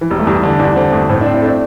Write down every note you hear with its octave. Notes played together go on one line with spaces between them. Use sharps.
E3
E1 G3
A3
E2 G3
D3 D4
E2 D4
D3 C4
E2 A3
A2 C4
D4
C4
E4
A3 D4